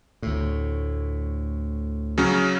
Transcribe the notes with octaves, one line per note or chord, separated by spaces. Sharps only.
D2 A2
C#3 F#3 C#4